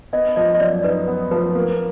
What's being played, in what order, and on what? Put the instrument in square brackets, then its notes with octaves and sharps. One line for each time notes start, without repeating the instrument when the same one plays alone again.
[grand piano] B3 [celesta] D#5
[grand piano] F3 [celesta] D#5
[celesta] D#5
[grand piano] F#2 [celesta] D5
[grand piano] D#4 [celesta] B4
[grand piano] B3
[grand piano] F3 [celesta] B4
[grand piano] A#3